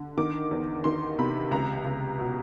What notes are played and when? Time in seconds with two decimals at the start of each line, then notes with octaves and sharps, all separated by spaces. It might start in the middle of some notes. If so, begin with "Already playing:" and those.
Already playing: D3
0.17 D#3 D6
0.51 E2
0.84 D#3 C6
1.19 C3 B5
1.51 C#2 A#5
1.85 C#2
2.19 B2